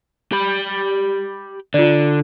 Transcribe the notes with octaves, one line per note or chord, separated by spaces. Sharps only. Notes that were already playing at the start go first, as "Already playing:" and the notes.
G4 B5
D3 F4 D5